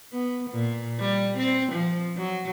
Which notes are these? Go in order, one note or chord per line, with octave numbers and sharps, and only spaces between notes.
B3
A#2
G3
C4
F3
F#3